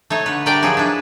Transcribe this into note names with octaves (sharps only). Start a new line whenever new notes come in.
A3 D#4 C#5
D3 B4
G3 D4 G4 A#4 D5 G5
F3 F#3 D#4 G#4
D4 E4 B4